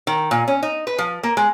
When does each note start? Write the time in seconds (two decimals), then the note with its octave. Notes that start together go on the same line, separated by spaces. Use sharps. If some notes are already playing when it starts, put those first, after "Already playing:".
0.07 D#3
0.31 A#2
0.48 C#4
0.63 D#4
0.87 B4
0.98 F3
1.23 A#3
1.37 G#3